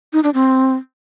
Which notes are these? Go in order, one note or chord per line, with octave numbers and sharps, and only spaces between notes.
D#4
D4
C4